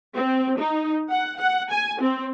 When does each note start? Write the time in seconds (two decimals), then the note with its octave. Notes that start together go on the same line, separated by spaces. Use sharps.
0.16 C4
0.59 D#4
1.10 F#5
1.39 F#5
1.71 G#5
2.01 C4